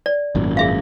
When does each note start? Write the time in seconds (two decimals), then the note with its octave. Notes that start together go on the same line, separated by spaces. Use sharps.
0.06 D5
0.35 G#1 F#2 A#2
0.57 G#4 E5 F5